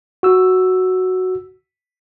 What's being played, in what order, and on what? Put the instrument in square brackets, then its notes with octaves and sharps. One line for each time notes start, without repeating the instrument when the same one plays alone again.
[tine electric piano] F#4 E6